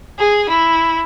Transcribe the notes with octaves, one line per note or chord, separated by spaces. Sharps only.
G#4
E4